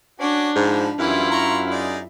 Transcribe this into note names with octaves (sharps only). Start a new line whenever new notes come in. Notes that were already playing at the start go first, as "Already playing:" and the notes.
C#4 D4 F#4 D6
G#2 F3 B5
F#2 E3 G3 E4 F4
A#5 C6 C#6
D#4 G#4 D5